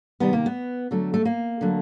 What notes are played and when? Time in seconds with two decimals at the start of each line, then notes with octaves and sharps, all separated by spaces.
0.20 C3 D#3 G3 B3
0.33 A#3
0.46 B3
0.91 D3 F#3 A3
1.14 A3
1.25 A#3
1.61 D3 F#3 A3